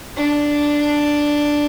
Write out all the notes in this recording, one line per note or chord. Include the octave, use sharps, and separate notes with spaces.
D4